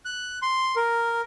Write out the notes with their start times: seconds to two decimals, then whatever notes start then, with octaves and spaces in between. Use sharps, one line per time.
0.05 F#6
0.42 C6
0.76 A#4